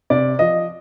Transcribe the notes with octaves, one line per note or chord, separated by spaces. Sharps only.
C3 D5
F3 D#5